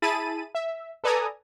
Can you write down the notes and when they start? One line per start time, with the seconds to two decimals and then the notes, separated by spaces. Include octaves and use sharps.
0.02 E4 G#4 A5 B5 A6 D#7
0.55 E5
1.04 A4 B4 D5 G#5 A#5 D#6